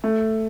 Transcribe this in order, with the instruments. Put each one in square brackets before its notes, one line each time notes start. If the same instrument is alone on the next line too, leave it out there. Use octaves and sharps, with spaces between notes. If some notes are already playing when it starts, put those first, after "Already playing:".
[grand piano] A3